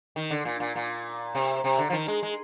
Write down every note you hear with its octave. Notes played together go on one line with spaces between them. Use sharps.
D#3
D3
A#2
A#2
A#2
C3
C3
D3
F3
D#3
G#3
G#3